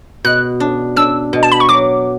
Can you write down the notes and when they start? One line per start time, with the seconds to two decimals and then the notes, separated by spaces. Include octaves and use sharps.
0.25 B2 F#6
0.60 D4
0.96 D4 E6
1.33 B2
1.43 A5
1.52 B5
1.60 C#6
1.69 F#3 D6